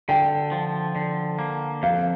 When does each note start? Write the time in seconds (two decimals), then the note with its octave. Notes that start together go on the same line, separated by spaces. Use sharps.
0.09 D3 G5
0.52 F3
0.96 D3
1.39 A#3
1.83 F2 F5